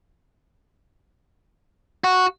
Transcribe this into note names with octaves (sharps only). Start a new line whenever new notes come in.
F#4